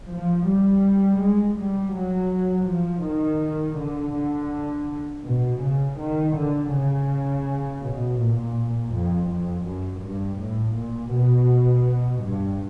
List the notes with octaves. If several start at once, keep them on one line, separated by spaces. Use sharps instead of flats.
F3
G3
G#3
G3
F#3
F3
D#3
D3
D3
B2
C#3
D#3
D3
C#3
B2
A#2
F2
F2
F#2
G2
A2
A#2
B2
G2